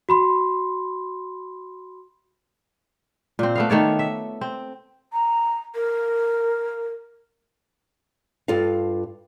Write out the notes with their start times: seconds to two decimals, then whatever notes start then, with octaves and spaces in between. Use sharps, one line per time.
0.09 F#4 B5 C6
3.39 A#2 C4
3.55 A3 B3 F5
3.70 D#3 A3 C#5 D5
3.99 E5
4.41 C4
5.13 A#5
5.75 A#4
8.48 G2 F4 A4 F5